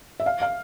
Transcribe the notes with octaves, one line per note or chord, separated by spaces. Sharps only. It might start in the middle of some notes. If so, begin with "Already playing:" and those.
E5
F5
F5